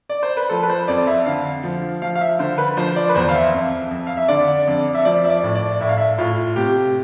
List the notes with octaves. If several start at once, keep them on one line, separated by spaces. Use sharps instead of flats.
D5
C5
B4
F3 A4
B4
C5
F2 D5
E5
D3 F5
F3
F3 F5
F5
E5
D3 C5
B4
F3 C5
D5
B4
E2 C5
F5
E5
F2
F2
F5
E5
D3 D5
F2
E5
F3 D5
E5
D5
A2
D5
A2 E5
F5
E5
A2 F4
C3 G4